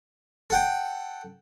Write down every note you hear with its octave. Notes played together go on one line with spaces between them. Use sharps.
A4 F#5 G5